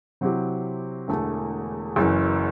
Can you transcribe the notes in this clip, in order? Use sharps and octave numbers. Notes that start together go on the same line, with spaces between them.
C3 F#3 C4 E4 G4
E1 E2 D3 A3
F#1 F#2 E3